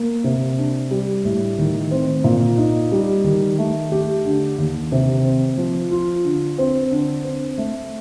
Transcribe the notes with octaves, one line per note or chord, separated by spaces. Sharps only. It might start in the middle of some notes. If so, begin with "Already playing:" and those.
Already playing: A#3
C3
D4
G3
A2
D#3
C4
A#2
D#4
G3
D#3
A3
G4
D3
D#2
C3
C4
F3
F4
D3
C4
D3
C4
A3